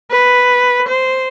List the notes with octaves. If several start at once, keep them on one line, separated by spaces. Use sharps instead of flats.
B4
C5